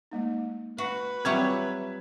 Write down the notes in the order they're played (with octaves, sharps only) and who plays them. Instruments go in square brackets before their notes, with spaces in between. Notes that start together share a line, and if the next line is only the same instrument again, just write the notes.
[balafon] G#3 A#3 D#4
[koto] F#4 [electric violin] B4
[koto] F#3 G3 C#5 [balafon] C4 F4 [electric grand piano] E5 G#6